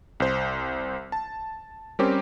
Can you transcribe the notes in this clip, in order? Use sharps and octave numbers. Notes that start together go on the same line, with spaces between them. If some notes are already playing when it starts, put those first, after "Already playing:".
C2 C5
A5
G3 C4 C#4 G4 A#4 C5